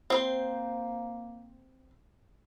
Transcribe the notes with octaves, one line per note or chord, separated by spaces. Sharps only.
A#3 C4 C5